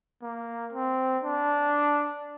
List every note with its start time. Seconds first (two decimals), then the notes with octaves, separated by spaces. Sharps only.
0.22 A#3
0.73 C4
1.24 D4